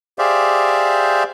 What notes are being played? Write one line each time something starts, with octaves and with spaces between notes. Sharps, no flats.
G4 G#4 C5 D5 E5 F5